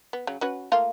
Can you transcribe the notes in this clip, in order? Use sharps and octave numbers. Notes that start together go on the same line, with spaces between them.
B3
C#3 F#3
C#4 F#4 B4
A3 A#3 F4